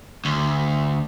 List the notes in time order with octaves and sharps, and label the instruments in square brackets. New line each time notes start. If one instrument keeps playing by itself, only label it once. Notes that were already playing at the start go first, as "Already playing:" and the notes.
[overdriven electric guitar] D2